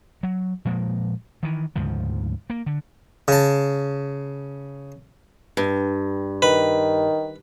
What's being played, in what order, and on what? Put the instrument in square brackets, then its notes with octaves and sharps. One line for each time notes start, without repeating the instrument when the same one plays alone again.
[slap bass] F#3
A#2 F3 G#3 A#3
D#3 E3
D2 G#2 C#3 F3
A#3
D3
[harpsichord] C#3 A5
[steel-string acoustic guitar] G2
[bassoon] D#3 [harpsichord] B4